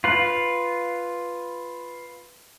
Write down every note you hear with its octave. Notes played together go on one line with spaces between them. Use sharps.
F4 B4